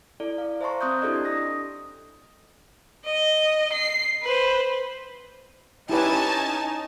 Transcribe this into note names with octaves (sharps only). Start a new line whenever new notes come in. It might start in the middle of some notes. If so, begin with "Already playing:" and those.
E4 A4 D5
F5
C5 E5 A5 A#5 C6 C#6
C4 C6 D#6 F#6 G6
D4 E4 G4 A4 D5 D#5
D4 D#6 A#6
D#5
C7
B4 C5
C#4 D#4 E4 G4 B4 G#5 A5